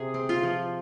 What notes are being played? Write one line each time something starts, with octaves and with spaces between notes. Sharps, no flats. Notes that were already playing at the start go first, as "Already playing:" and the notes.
Already playing: C3 G#4
C4
F4
F3